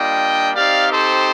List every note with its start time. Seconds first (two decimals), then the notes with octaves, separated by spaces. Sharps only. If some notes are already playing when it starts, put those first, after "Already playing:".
Already playing: G3 A#3 D4 F4 D#5 G5
0.55 C4 D#4 G4 D5 F5
0.91 A4 C5